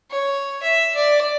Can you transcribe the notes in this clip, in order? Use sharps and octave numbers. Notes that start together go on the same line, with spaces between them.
C#5
E5
D5